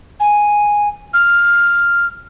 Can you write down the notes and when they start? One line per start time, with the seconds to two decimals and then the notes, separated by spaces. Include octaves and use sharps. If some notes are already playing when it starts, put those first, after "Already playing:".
0.20 G#5
1.13 F6